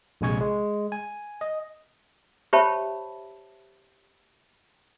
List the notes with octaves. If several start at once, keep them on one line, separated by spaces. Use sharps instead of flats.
A#1 C3 G#3 G#5 C#6 G#6
G#3
G#5
D#5
G4 C5 C#5 E5 A5 B5